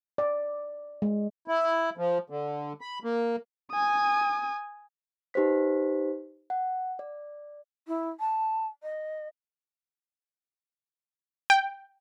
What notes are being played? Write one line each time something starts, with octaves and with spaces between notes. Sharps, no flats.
D5
G#3
E4
F3
D3
B5
A#3
G#5 D#6
D#4 G4 B4 C5 B6
F#5
D5
E4
A5
D#5
G5